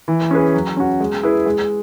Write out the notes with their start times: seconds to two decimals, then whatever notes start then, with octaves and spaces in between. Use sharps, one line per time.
0.08 E3
0.31 C#4 G#4 B4
0.54 F#3
0.77 C#4 F#4
1.00 G#3
1.23 E4 G#4 B4
1.46 G#3